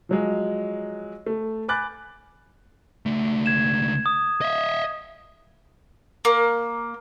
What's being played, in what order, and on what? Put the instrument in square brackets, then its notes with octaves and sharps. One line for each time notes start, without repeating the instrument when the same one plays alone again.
[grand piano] F3 F#3 G#3
A3
G#5 B5 D6 F#6 G6 A6
[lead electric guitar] C#2 A3
[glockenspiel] G#6 E7
D#6
[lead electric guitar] D#5 E5
[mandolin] A#3